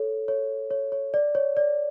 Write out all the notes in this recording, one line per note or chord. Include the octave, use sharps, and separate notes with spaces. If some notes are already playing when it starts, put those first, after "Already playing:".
Already playing: A4 C#5
C#5
C#5
C#5
D5
C#5
D5